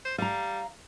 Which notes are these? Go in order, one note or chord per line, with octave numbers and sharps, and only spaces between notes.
C5
G3 F5 A#5